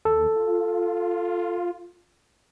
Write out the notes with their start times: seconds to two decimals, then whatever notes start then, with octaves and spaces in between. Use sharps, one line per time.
0.05 D#2 A4
0.36 F4